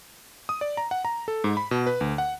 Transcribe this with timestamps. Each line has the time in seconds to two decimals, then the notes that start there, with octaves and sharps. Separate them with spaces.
0.49 D#6
0.61 D5
0.77 A#5
0.91 F#5
1.05 A#5
1.28 A4
1.44 G#2
1.57 B5
1.71 B2
1.86 B4
2.01 D2
2.18 F#5